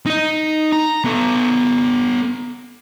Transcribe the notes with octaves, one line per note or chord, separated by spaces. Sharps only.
D#4 D#5
A#5
B3 A4